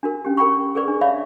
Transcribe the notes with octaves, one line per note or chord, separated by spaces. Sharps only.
D4 F#4 A#4
C#4 G4
A#4 G5 B5 C#6
G#4 A#4 B4 D5 C#6
D4
C#5 D5 E5 F5 B5